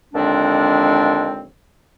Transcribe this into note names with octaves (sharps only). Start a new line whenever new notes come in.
D#2 D3 F3 G#3 C4 D4